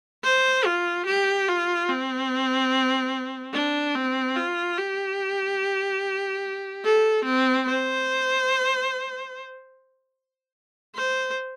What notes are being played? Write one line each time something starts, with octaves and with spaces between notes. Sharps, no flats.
C5
F4
G4
F4
C4
D4
C4
F4
G4
A4
C4
C5
C5